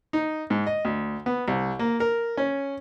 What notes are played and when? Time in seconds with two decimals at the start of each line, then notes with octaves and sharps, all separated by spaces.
0.13 D#4
0.50 G#2
0.67 D#5
0.85 D2
1.26 B3
1.48 C2
1.79 A#3
2.00 A#4
2.37 C#4